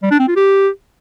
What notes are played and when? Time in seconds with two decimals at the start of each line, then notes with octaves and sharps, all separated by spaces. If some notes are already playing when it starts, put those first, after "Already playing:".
0.03 G3
0.11 D4
0.19 C4
0.28 F4
0.36 G4